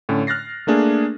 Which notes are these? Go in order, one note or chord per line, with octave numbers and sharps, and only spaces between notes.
A2 D3 C#4
F6 F#6 A6 A#6 C7
A3 A#3 D4 G#4